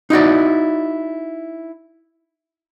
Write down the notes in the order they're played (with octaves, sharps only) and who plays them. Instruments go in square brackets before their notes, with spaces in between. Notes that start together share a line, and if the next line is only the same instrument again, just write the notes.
[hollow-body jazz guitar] D#4 E4 F#4 D5